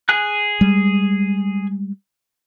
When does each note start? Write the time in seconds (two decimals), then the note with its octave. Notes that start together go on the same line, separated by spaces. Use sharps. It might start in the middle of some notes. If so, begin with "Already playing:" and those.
0.09 G#4 G#5 F#6
0.61 G3 G#3